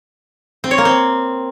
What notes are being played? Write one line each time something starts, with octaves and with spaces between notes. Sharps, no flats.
C4
C#5
A#3
C4